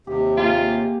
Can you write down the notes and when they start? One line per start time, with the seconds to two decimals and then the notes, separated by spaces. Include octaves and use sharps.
0.07 D#2 C3 G4
0.37 A#3 F4 G4 G#4